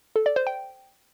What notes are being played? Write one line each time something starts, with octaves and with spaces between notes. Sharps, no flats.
A4
D5
C5
G5